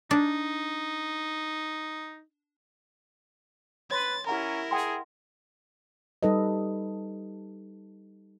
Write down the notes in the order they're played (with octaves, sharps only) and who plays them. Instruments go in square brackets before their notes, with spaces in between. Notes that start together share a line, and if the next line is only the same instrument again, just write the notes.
[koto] D4 [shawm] D#4
[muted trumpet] B4 [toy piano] C#5 C6 [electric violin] A6
[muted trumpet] C#4 [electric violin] E4 A#4 [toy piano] G4 F#5 A#5
[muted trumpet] G#4 [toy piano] F#5 G5 C6
[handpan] G3 D#4 A4 B4 D#5